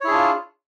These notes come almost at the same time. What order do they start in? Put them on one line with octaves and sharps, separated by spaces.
C#5 E4 G#4 D4 F4